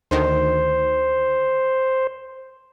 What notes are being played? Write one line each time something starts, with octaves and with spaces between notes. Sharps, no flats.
D2 D#3 C5